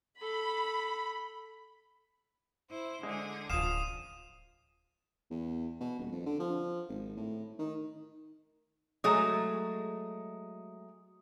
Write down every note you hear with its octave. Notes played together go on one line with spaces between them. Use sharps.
A4 B5
E4 C5
D3 G#3 G#4
D1 C#3 F3 F5 D#6 D#7 E7
E2
B2
D#1
F2
D3
F3
G#1
A2
D#3
F#3 G#3 A3 G#4 G#5 A#5 D#6